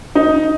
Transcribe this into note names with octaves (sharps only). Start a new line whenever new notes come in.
D#4